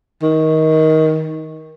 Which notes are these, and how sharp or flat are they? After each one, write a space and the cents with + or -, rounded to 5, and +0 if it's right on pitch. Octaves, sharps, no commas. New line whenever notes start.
D#3 +20